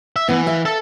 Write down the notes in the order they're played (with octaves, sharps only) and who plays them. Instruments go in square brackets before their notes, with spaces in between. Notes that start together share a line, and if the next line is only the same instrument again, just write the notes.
[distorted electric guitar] E5
[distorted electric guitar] E3 [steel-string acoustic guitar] B3
[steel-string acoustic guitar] E5 F5
[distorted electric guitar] A4